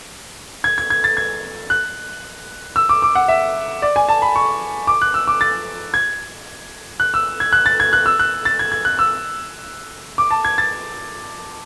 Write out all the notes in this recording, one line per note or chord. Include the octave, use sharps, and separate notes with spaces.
G#6
G#6
G#6
A6
G#6
F#6
E6
D6
D6
F#5
E5
D5
G#5
A5
B5
C#6
D6
F#6
E6
D6
A6
G#6
F#6
E6
G#6
F#6
A6
G#6
F#6
E6
F#6
A6
G#6
G#6
F#6
E6
D6
A5
G#6
A6